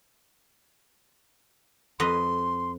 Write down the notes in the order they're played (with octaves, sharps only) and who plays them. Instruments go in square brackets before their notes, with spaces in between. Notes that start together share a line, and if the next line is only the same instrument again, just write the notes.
[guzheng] F2 B4 D#5 [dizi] C6